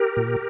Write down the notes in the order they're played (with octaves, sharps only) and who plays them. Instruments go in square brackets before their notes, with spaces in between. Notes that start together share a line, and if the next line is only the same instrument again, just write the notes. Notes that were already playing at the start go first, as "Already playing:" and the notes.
Already playing: [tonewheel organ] G4 A#4
A#2